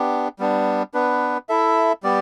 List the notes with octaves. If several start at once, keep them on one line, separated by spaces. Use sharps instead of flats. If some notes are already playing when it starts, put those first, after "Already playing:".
Already playing: B3 D4 G4
G3 B3 D4
B3 D4 B4
E4 A4 E5
G3 B3 G4 D5